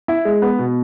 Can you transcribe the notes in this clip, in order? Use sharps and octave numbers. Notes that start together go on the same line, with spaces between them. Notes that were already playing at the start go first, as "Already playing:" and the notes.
E4
G#3
B3
B2